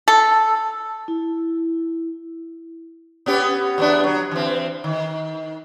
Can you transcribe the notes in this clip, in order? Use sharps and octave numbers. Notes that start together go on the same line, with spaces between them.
A4
E4
B3 C#4 G4
E2 B3 D4
F#3
E3 C4
D#3